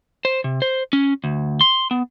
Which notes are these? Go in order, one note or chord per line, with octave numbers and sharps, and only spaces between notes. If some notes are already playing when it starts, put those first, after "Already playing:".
C5
C3
C5
C#4
D2
C6
B3